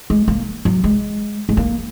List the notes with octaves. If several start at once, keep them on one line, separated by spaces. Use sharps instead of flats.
G#3
A#3
F#3
G#3
G#3
A#3